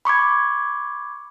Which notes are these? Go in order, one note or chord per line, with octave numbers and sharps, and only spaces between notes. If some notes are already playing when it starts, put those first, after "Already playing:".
B5 C#6 D6 G#6